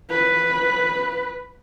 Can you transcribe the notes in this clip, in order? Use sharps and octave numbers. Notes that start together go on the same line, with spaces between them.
B4